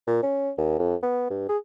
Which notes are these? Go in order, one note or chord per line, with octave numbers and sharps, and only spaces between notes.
A#2
C#4
D#2
F2
B3
G2
G#4